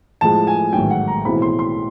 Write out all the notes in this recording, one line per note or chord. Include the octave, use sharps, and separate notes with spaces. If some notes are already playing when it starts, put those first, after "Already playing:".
A2 F3 G#3 A5
G#5
A1 G#2 D#3 F#3 G5
F#5
A#5
B1 A2 E3 G#3 C4 B5
C6
C6